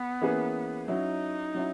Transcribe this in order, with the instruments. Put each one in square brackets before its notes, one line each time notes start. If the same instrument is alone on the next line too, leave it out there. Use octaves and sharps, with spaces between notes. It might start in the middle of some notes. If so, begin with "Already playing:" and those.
Already playing: [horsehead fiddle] B3
[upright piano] E3 A#3 C#4 G#4 B4
[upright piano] F#3 C#4 E4 [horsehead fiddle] D#4
[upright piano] F#3 C#4 E4